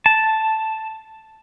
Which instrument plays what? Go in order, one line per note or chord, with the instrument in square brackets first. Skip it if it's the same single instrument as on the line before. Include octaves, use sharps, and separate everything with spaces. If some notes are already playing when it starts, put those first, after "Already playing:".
[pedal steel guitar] A5